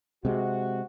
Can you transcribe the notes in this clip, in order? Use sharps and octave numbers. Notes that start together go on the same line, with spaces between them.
C3 G#3 F#4